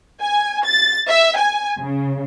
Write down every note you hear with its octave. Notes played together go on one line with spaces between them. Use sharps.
G#5
A6
E5
G#5
C#3